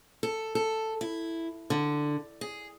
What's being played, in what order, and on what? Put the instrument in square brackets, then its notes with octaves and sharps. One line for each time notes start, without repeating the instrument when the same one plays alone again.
[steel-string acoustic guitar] A4
A4
E4
D3
G#4